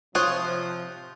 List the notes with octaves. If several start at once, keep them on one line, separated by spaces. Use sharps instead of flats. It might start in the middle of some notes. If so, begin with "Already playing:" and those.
C3 F3 F4 C5 C#5 D#6 F#6